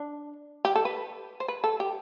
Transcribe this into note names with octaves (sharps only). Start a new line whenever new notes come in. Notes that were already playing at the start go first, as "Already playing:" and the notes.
Already playing: D4
G4
A4
B4
C5
B4
A4
G4